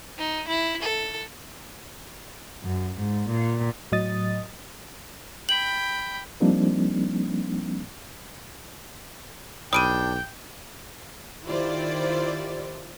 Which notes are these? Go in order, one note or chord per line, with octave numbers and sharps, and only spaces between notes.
D#4
E4
A4
F#2
G#2
A#2
A2 F#3 D#5 D#6 A6
G5 B5 F#7
F3 G3 A#3 C4 D4 D#4
B1 G3 D4 G5 D#6 D7 D#7
D#3 E4 F4 G4 C5 D5